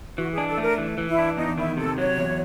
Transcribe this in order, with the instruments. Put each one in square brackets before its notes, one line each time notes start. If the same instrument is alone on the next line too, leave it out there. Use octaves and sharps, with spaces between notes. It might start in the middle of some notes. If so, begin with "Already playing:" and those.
[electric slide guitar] E3 [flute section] F#4
[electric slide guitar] D4 [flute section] G#4
[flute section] A4
[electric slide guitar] A3 [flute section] A#4
[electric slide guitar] E3
E3
[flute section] E4
[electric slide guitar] D4
[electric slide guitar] E2 [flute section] D#4
[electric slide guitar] D#3 [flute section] E4
[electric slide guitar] C3 [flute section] A4
[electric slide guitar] F#3 [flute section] C#5
[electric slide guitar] E2